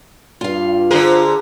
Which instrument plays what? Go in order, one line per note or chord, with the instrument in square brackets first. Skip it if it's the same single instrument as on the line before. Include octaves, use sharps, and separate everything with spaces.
[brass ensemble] G2 [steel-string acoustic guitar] F4 F5
[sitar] D3 A#4 [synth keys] G#4 C5